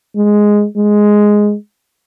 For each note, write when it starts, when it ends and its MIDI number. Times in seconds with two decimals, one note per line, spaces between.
0.16 0.66 56
0.77 1.55 56